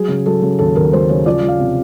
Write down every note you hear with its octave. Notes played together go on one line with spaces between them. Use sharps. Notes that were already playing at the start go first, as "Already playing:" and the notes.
Already playing: F#3 G#4
C#3
F#3 A4
C#3
D#2 A4
D#2 A#4
F#3 C5
C#3 C#5
F3 D5
F3
F5
C3